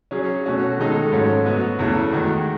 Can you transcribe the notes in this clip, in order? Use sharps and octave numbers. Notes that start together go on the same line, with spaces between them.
F#3 C#4 G#4
B2 A3 C#4 F#4
D#3 G#3 D#4 A4
G#2 F#3 A3 C#4
F#3 B3 F#4
E2 C#3 E3 A3
D#3 G#3 D#4 F#4